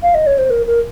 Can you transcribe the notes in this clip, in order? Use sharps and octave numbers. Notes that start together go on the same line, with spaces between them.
F5
D#5
C#5
C5
A#4
A#4